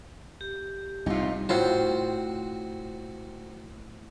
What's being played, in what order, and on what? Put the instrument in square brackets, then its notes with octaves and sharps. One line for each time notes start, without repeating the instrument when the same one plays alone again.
[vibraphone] G4
[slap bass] C2 A2 [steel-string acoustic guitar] D#4 F4
[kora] A2 F4 C5 [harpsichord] C4 F#4